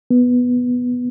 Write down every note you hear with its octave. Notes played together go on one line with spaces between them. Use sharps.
B3